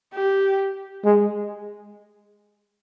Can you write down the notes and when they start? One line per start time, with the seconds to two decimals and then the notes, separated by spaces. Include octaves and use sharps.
0.14 G4
1.05 G#3